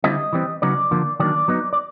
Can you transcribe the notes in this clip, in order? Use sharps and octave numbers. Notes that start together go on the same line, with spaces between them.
D3 G3 C4 E4 D#5
E3 G3 C4
C#3 F#3 B3 D#4 D5
D3 F3 A#3
D#3 F#3 A#3 D4 D5
F#3 B3 D#4
D5